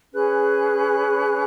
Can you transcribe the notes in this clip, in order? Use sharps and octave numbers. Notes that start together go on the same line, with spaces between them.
C#4 G#4 B4 F#6